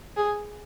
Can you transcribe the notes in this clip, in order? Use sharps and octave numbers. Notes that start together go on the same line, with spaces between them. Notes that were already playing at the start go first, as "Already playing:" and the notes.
G#4